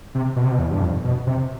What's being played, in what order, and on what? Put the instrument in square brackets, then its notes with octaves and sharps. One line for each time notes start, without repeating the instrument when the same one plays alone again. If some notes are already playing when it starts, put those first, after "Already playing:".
[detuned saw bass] C3
B2
C3
B2
E2
G2
F2
B2
C3